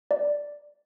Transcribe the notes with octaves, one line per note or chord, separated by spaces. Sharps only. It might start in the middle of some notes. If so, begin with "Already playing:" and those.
D5